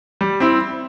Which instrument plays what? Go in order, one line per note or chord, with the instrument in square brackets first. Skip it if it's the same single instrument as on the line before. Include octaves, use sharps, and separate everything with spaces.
[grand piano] G3
C4 E4